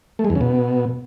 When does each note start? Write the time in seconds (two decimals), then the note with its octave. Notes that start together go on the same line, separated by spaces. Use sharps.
0.19 A3
0.25 G#3
0.30 E2
0.35 C#3
0.41 B2